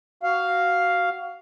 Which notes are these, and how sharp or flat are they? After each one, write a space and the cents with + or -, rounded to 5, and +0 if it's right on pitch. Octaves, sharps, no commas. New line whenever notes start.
F#4 +15 F5 +0